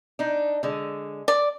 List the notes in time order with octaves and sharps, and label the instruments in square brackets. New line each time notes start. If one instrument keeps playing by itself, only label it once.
[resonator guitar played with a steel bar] D4 D#4
D3 G#3
[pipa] D5